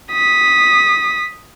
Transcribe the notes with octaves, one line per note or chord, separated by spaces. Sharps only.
D#6 B6